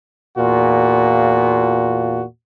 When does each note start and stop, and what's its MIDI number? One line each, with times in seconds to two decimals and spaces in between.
0.37 2.23 40
0.37 2.23 46
0.37 2.23 65
0.37 2.23 66